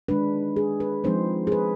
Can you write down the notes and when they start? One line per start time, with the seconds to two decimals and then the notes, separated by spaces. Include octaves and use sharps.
0.08 D#3 G#3 D4 B4
0.56 G#4
0.80 B4
1.04 F3 G#3 C4 D#4 C5
1.47 G#4
1.52 B4